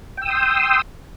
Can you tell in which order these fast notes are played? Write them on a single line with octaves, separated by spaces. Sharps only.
G5 E6 D#6 C6